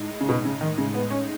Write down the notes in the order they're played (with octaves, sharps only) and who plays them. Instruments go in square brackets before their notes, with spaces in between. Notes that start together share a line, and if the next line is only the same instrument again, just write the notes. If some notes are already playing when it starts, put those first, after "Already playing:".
Already playing: [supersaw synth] A2 G#3 D#4
[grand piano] C#3
B2
C#3
D#3
C#3
B3
C#4